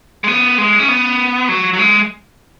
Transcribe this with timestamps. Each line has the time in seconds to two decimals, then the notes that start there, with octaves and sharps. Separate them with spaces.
0.24 G#3
0.28 B3
0.58 G#3
0.79 C#4
0.89 B3
1.49 F#3
1.73 F#3
1.79 G#3